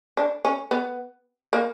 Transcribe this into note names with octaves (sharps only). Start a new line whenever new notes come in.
D4
C#4
B3
A#3